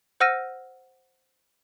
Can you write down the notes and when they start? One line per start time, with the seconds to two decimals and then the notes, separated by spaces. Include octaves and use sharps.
0.20 C5 F#5 E6 F6 A#6 D#7